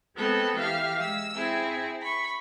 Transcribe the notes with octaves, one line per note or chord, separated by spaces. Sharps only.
G#3 B3 C4 A4
E3 G4 E5 F5 F6
G#3 E6
C4 E4 G#4
B5 C#6